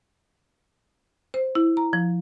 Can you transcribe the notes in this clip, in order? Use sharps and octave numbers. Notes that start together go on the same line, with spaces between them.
C5
E4
A#5
F3